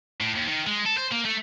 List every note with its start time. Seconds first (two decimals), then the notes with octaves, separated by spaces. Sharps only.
0.21 A2
0.36 D#2
0.47 D#3
0.67 G#3
0.86 A4
0.98 C5
1.12 A#3
1.25 A3